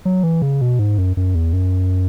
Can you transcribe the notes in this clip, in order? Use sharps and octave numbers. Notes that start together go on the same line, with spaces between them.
F#3
E3
C#3
B2
G#2
F#2
F#2
E2
F#2